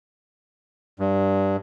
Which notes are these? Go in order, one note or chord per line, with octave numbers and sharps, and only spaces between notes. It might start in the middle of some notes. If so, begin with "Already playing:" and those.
G2